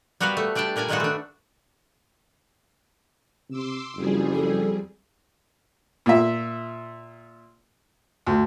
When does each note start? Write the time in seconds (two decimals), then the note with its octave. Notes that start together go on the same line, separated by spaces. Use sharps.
0.20 G3 B3 F#4 A#4 B4 F5
0.37 A3
0.55 G3 D4 D5 G5 A5
0.76 A#2 D4 A#4 D5 G#5
0.88 D#3 G3 G#3 B3 F4 F#4
1.00 A3 D4
3.50 C3 C6 D6 E6
3.96 F#1 F2 G3 G#4
4.33 A4
6.06 A#2 E5
8.27 D2